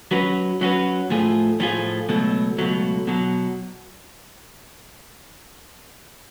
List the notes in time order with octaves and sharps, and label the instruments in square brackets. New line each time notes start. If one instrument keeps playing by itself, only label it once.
[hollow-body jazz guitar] F#3 C#4 F#4 B4
F#3 C#4 F#4 B4
A2 F3 A3 F4 G#4
A2 F3 A3 F4 G#4
C#2 B2 F#3 A3
C#2 B2 F#3 A3
B2 F#3